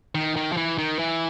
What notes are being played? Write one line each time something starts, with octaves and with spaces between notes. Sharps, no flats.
D#3
D#3
F3
E3
D#3
E3